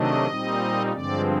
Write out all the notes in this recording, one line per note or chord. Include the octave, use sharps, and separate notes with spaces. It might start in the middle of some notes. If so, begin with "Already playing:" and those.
Already playing: C3 D#3 F#3 A3 D4 D#5
A#2 G3 C4 D#4
G2 D3 F3 G#3 C4 D5